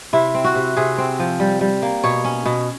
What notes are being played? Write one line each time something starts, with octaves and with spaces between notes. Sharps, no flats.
C3 E4
C4
F#4
C3
C3 G#4
C4
F3
G3
G3
A#3
B2 C#5
C#4
B2